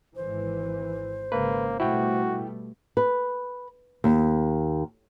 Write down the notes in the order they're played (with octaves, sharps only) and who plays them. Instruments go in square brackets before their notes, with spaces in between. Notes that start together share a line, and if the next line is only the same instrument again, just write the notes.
[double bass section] G#1 E3 [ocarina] C5
[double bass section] G#1 C#3 [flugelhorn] A#3 [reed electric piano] B4
[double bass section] B2 G3 A3 [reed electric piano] E4 G5 [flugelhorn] F#4
[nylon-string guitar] B4
D#2